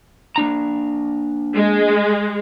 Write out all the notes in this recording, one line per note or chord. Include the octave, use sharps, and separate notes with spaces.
A#3 D4 A#5
G#3